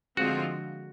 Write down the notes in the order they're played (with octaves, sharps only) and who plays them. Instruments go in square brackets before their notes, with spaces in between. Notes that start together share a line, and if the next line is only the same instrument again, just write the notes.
[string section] D3 F3 G#3 C4 F4 [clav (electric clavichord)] F#4